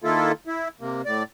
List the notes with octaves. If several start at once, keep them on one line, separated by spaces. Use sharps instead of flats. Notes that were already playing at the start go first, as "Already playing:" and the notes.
D#3 A#3 E4 F4 A4
E4
C3 A#3
A2 D5